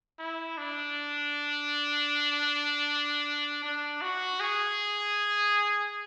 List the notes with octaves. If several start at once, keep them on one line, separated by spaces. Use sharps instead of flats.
E4
D4
D4
F#4
G#4